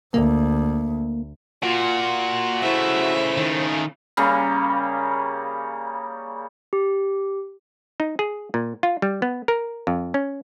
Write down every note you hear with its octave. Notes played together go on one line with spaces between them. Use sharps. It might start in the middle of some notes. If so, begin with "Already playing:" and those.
D2 A#3
A#2 F4 F#4
C#3 A3 E4 C5 E5
D#3
C#3 G3 A#3
G4
D#4
G#4
A#2
F4
G3
B3
A#4
F2
C#4